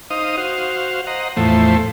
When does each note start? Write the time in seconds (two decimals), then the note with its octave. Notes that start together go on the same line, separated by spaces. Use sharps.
0.10 D#4 C5 D#5 F5 D#6
0.37 F#4 C5 F5
1.07 C5 D#5 F#5 A#5
1.37 E2 A2 F3 A3 C5